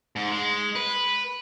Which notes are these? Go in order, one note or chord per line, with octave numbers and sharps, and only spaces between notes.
G#2
G#3
B4